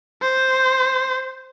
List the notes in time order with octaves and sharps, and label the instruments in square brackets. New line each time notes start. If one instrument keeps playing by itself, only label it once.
[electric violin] C5